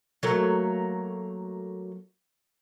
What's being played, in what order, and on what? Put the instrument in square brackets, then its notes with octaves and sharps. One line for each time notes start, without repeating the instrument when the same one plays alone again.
[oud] F#3 A3 A#3